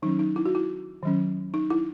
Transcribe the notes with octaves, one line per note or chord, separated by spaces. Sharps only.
D#3 F#3 C#4 D#4
D#4
E4
F#4
E4
D#3 F#3 C#4
D#4
E4